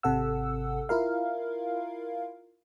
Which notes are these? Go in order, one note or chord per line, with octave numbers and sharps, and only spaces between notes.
G#1 C3 A4 F#5 E6
E4 F4 A#4 F5